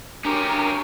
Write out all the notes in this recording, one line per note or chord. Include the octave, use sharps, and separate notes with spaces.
C#4 D4 F#4 G4 A#4